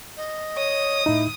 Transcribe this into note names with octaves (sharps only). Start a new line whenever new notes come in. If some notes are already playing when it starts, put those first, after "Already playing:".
D#5
C#5 D#6
A2 D#4 E4